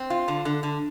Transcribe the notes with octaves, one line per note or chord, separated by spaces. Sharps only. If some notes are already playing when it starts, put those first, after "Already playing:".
Already playing: C4
F4
D3
D3
D3